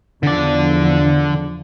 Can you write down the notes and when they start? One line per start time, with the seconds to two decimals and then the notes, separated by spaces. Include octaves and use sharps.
0.23 E2 D3 F3 D5